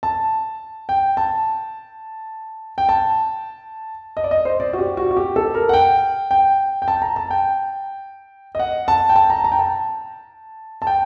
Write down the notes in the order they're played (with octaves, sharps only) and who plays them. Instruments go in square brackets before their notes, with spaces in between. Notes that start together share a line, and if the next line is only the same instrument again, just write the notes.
[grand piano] A5
G5
A5
G5
A5
D#5
D5
D#5
C5
D5
F#4
G4
F#4
F#4
G4
A4
A#4
F#5
G5
G5
G5
A5
A#5
A5
G5
D#5
F#5
A5
G5
A5
A#5
A#5
G5
A5
A5
G5